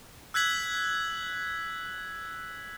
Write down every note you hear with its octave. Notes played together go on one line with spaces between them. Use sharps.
E6 F#6 G#6 B6 F#7